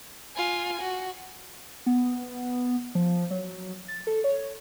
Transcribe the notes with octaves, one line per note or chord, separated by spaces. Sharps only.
F4 G#5
F#4
B3
F3
F#3
A6
A4
C#5